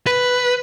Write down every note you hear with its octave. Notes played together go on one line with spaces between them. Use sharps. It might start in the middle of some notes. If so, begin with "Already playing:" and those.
B4